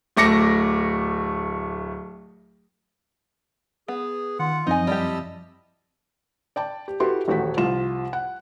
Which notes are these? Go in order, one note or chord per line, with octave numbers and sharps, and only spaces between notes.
D1 A3 D6 A#6 C#7
B3 G#4
D#3 F4 F#5
F#2 F3 C4 D#4 D#5 G#5
G3 E4 G4 A5 E6
D5 G5 A5
G4
E4 F#4 G4 A4 B4 C6
D#1 A1 F#4 A4 G5 B6
C2 F3 F4 E7
F#5